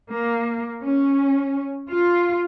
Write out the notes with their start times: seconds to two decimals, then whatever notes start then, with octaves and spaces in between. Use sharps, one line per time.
0.11 A#3
0.83 C#4
1.90 F4